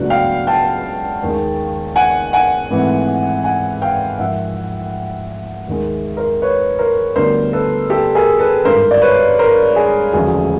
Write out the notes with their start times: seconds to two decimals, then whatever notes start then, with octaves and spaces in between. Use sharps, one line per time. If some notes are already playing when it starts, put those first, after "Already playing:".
Already playing: C#2 B2 F#3 A3 D4 F#5
0.10 F5 G5
0.47 G5 A5
1.23 D#2 D#3 G#3
1.96 F#5 G#5
2.33 F#5 G#5
2.70 G#2 E3 A3 C4
3.44 F#5 G#5
3.82 F5 G5
4.18 G#2 F3 A#3 E5 F#5
5.67 D#2 D#3 G#3
6.17 A#4 C5
6.42 B4 C#5
6.79 A#4 C5
7.15 D2 D3 G3 B3 A#4 C5
7.53 A4 B4
7.90 G4 A4
8.15 G#4 A#4
8.39 A4 B4
8.64 G#1 G2 D#3 A#4 C5
8.91 D5
9.01 B4 C#5
9.39 A#4 C5
9.76 G#4
10.13 E1 D2 C#3 F3 A3 G#4